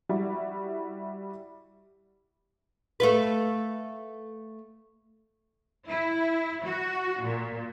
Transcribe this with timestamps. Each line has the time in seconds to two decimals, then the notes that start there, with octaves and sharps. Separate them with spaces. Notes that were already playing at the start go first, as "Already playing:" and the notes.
0.09 G3 E4 F#4
3.00 A3 F4 B4
5.88 E4
6.64 F#4
7.23 A#2